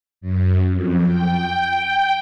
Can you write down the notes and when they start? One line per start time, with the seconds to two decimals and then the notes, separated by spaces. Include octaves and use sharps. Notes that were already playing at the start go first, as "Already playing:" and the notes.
0.21 F#2
0.71 F2
1.06 G5